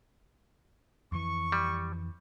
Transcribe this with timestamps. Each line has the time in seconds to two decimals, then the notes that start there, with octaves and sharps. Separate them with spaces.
1.12 F2 E3 C#6
1.52 G3